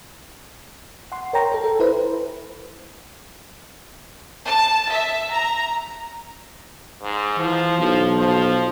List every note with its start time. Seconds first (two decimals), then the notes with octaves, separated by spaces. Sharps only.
1.12 F#5 C6
1.33 A#4 C#5 G5 A#5
1.52 A4 A#4
1.64 A4
1.80 E4 B4 C5
4.46 A5
4.91 E5
5.32 A#5
7.02 G#2
7.39 E3 F3
7.78 B1 F3
8.19 F3